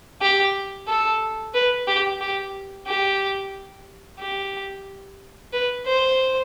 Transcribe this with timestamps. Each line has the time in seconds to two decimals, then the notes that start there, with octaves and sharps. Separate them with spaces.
0.21 G4
0.87 A4
1.54 B4
1.87 G4
2.21 G4
2.87 G4
4.19 G4
5.53 B4
5.86 C5